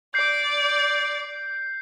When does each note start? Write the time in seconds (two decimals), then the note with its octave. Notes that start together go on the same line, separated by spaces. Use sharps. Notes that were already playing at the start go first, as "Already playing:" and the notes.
0.14 D5 G6 C7